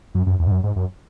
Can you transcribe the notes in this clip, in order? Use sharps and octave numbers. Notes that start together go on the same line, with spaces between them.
F#2
F#2
E2
G#2
F#2
G#2
F#2